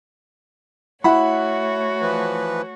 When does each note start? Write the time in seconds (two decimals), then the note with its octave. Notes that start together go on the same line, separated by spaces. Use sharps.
1.04 A3 E4 F#4 C#5 F#5 B5
2.02 E3 F3 B4